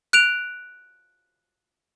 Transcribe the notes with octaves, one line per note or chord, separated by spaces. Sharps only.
F#6 D7 F7